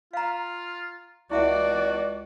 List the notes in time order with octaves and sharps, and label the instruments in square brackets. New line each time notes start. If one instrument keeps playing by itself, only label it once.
[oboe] F4 [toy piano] F5 A#5
[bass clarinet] C#2 [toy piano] E4 E5 F#5 [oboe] F#4 [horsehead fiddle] D5